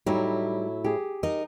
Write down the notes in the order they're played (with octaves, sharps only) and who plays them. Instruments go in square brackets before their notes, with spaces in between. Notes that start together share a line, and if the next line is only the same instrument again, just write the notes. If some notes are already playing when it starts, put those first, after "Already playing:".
[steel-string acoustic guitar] A2 F#3 E4 [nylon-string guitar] G3 D#4
[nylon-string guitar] G4 G#4
[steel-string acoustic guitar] D#4 A#4 D#5